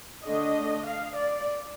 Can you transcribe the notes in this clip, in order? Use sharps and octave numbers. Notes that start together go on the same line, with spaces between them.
D3 A3 D4 D#5
F5
D5